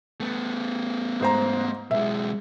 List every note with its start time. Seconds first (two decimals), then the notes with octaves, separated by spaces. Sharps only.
0.20 A3 B3
1.21 G#2 C5 A#5
1.91 B1 G#3 E5